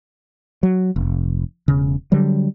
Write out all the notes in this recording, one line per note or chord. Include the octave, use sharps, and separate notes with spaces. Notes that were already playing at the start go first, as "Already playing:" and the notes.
F#3
F1
E1 C#3
D3 F#3 G3